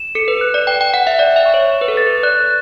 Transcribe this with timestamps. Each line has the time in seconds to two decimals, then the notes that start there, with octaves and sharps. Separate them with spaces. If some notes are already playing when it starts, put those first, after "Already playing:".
Already playing: E7
0.15 A4 C#7
0.28 B4
0.41 F#6
0.54 D5
0.67 G5 G7
0.81 G5
0.93 F#5 E7
1.07 E5
1.19 D5 F#6
1.36 E5
1.46 C#6
1.54 C#5
1.72 E7
1.81 B4
1.88 A4
1.97 A6
2.07 B4
2.23 D5 F#6